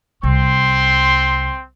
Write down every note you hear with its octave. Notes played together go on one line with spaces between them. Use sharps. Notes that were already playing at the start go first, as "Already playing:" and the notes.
C2 C4 C6